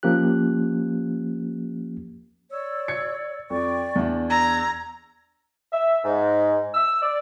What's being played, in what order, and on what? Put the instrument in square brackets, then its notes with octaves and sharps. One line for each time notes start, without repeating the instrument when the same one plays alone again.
[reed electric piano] F3 A#3 C#4 G4 F#6
[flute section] C#5 D5 E6
[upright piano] G#6 C#7
[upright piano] F2 [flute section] D5 G5 C#6
[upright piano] E2 D4
[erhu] A#5 [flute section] E6 G#6
[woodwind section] E5
G#2
E6
D5